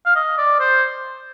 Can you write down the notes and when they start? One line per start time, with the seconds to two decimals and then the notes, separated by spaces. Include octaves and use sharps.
0.06 F5
0.16 D#5
0.38 D5
0.60 C5